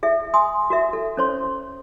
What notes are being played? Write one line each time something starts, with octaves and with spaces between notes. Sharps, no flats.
G#4 E5
G#5 C6 D#6
F#4 A#4 E5
A4
C#4 A4 C5 C#5 C6